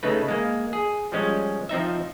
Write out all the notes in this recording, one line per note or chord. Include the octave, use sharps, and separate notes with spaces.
C#3 A3 D#4 B4
G#3 A#3
G#4
F3 G3 G#3 C#4
F3 C4 D#4 E5